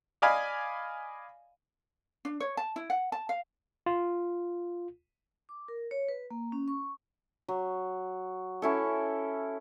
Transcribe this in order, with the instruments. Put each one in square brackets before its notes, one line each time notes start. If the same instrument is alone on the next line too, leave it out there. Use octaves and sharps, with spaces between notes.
[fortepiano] D5 D#5 F5 G#5 B5
[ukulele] D4
C#5
A5
E4
F#5
A5
F5
[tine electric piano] F4
[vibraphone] D6
A#4
C#5
B4
A#3
C#4
C#6
[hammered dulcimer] F#3
C#4 E4 A4